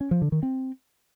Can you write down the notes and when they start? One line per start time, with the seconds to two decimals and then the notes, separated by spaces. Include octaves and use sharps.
0.01 C#4
0.11 F3
0.22 D3
0.32 D#3
0.43 C4